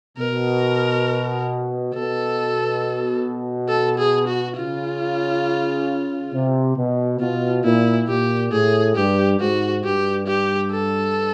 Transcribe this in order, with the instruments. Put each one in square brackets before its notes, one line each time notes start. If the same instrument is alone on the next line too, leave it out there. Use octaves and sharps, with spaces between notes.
[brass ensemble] B2 [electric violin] A#4
[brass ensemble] B2 [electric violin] A4
[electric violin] A4
G#4
F#4
[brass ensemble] C#3 [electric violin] F4
[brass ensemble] C3
B2
[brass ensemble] B2 [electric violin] F4
[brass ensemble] A#2 [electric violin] E4
[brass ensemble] A#2 [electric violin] G4
[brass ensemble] A2 [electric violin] G#4
[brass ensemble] G2 [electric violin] G4
[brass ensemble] G#2 [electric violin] F#4
[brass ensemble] G2 [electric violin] G4
[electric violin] G4
A4